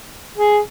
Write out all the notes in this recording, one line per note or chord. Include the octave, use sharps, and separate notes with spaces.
G#4